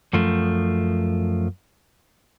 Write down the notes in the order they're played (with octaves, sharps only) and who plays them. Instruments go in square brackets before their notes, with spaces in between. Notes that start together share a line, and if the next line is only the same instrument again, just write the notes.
[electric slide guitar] F#2 F3 A3